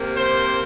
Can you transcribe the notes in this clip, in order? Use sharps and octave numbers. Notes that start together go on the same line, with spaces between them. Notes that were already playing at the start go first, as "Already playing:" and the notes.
Already playing: C3 A#3
C5